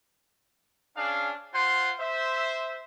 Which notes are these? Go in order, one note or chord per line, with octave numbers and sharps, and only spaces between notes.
C#4 D4 G#4 F5
F4 C5 F#5 C6
C5 E5